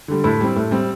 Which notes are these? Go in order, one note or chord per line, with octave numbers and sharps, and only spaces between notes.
D3 G3
A2 E4
G3 C4
A2
G3 C4